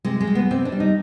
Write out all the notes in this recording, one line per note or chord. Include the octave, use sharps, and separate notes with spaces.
C3 G#3
G#3
G3
B3
C3 C4
D4
G3
D#4